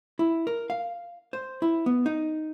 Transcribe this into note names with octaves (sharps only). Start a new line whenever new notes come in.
E4
A#4
F5
C5
E4
B3
D#4